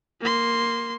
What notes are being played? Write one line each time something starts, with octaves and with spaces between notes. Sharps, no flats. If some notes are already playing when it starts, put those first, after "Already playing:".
A#3 C6